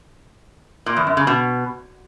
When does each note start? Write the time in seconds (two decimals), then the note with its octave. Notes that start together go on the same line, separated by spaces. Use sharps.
0.86 A#2
0.97 E2
1.07 F#2
1.17 C#3
1.27 B2